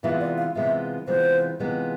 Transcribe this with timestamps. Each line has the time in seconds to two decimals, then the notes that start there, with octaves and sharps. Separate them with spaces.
0.03 C3 E3 G#3 B3 F4 E5
0.20 D5
0.38 F5
0.55 C3 E3 G#3 B3 F4 E5
1.07 C3 E3 G#3 B3 F4 C5
1.59 C3 E3 G#3 B3 F4